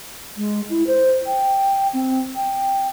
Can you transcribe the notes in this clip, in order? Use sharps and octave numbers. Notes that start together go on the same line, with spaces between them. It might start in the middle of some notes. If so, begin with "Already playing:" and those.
G#3
E4
C5
G5
C4
G5